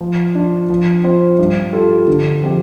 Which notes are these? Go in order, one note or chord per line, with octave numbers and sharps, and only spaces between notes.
F3
D4 F4
F3
C4 F4 C5
G2
G3 F4 A4
D3
F3 C4 G4